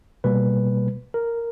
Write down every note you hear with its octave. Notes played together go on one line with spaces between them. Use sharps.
B2 G3 A#3 B4
A#4